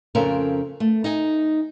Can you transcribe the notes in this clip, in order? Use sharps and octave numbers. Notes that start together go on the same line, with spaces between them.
F2 C#3 C4 C#4 A4 A#4
A3
D#4 G#5